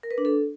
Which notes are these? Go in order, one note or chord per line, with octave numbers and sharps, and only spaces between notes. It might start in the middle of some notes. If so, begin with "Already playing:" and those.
A#4
B4
D4
A4